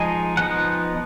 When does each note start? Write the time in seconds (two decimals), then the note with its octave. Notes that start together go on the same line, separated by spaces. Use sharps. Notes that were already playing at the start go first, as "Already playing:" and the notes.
Already playing: F3 G#3 D#4 G#5
0.37 F3 B3 D#4 F#5